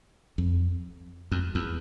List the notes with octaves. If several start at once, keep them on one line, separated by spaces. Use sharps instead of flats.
F2
F2
E2